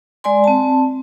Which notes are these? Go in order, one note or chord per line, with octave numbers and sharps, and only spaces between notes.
G#3 D5 G#5 C6
C4 A5